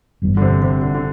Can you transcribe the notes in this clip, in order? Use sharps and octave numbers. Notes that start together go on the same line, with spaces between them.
G1 G2 E3 G3
D3
C3
C3
D3
D3